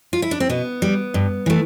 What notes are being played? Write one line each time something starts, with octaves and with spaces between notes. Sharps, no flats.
F4
E4
D4
C4
B2 B3
G3
G2
E3 A3